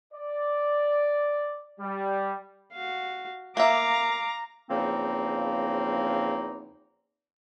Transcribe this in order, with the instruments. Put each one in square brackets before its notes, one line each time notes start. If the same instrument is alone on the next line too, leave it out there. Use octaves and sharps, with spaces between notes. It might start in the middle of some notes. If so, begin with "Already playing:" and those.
[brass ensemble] D5
G3
[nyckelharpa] F#4 F5
[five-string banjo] A#3 E5 [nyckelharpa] F5 D6 [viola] A#5
[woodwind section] E2 C#3 F3 A#3 C4 D#4